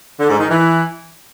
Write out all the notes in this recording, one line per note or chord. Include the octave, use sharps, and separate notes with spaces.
D3
G#2
D#3
E3